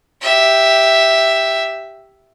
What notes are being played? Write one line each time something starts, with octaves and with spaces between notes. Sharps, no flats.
G4 E5